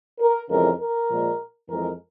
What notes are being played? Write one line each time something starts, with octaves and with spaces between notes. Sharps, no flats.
A#4
F2 C#3 E3 G#3 A#4
A#4
A#2 F3 G#3
F2 E3 G#3 A#4